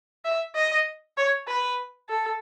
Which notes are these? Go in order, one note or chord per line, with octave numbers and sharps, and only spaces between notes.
E5
D#5
C#5
B4
A4